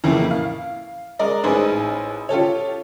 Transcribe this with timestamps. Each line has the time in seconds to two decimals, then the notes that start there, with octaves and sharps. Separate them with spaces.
0.04 F2 A2 C#3 E3 A#3
0.31 F5
1.19 G#3 A#4 D5 D#5
1.43 A1 D#4 G#4 B4 C5
2.29 F4 G4 A4 C#5